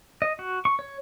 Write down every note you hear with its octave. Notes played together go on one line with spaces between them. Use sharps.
D#5
F#4
C#6
C#5